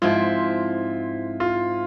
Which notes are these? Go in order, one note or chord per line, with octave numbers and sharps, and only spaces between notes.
G#2 F3 C4 E4 F4
F4